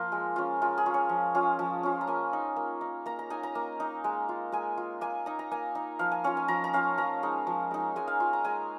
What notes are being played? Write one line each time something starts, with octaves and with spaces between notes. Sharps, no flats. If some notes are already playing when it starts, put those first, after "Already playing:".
Already playing: F3 A#3 F4 A#4
G#3
C#4 F4
G#3 F4
G#4
C#4 F4
C#5
F3
C#4 F4
F3
C#4 F4
A#5
A#3 G#5
D#4
A#3
D#4
A#3 A#5
A#5
D#4 G#5
A#5
A#3
D#4
G#3
F4
G#3 G#5
F4
A#3 G#5
D#4 A#5
A#5
A#3 G#5
D#4
F3 F5
G#5
C#4 F4 C#5
G#5
F3 A#5
A#5
C#4 F4 F5
F3 A#5
G#3 D#4
F3
G#3 D#4
G#3 G#5
F5
F4
A#5
G#3 G#5